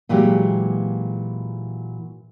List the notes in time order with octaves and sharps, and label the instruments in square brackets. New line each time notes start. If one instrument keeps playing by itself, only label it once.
[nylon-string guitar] A#2 E3 F#3 G#3 A#3 G4